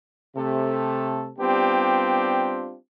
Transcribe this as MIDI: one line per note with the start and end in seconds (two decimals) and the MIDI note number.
0.36 1.30 48
0.36 1.30 57
0.36 1.30 69
1.38 2.75 55
1.38 2.75 59
1.38 2.75 60
1.38 2.75 62
1.38 2.75 65
1.38 2.75 67